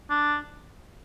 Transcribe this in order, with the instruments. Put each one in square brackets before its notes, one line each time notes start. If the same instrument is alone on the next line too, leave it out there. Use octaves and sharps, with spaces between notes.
[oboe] D4